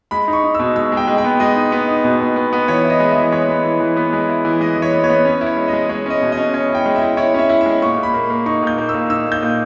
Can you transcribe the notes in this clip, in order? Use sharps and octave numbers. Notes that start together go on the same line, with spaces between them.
G#3 B5
D#4
C#6
D#4
B2 E6
G#3 E6
G#3
G5
G#3
G5
B3
G#3 D#5
D#4
B3
D#4
B2
B3
B3
B3
E3 C#5
E4
D#5
G#3
E3 E5
G#3 C#5
B3
E3
E3
B3
G#3
E4
E3
G#3 D#5
E3
C#5
B3
C#5
B3
C#4
E4
C#5
G#3
D#5
G#3
G#3 C#5
C#4 D#5
B2
D#5
C#4
C#4 C#5
E4
G5
G#3
E5
E4
E4 C#5
C#4 E5
E4
E5
G#3
A#2 C#6
A#2
B5
A#3
A#3
D#4 C#6
A#2 G6
A#3
E6
A#2
D#4 E6
A#2
G6
A#2